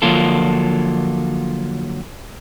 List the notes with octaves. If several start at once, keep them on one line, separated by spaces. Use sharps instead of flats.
D3 F3 F#3 A#3 F4 A4